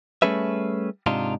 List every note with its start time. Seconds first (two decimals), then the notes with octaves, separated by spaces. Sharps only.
0.22 G3 A3 C#4 G#4 B4 E5
1.06 G#2 C3 D4 D#4 F4